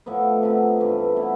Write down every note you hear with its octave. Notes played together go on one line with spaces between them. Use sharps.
A2 F3 B3
C3 F3 B3
G2 E3 A3
B2 A3 E4